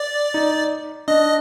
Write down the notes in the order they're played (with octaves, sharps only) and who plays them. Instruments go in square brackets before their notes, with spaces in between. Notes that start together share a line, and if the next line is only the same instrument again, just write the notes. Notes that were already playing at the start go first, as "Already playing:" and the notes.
Already playing: [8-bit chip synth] D5
[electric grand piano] D#4
[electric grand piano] D4 [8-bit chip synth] D#5